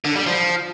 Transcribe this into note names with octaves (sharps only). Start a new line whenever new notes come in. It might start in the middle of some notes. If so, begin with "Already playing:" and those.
D3
G3
F3